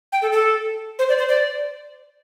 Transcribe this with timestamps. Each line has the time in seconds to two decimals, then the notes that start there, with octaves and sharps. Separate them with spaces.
0.12 G5
0.22 A4
0.32 A4
0.99 C5
1.09 D5
1.18 C5
1.29 D5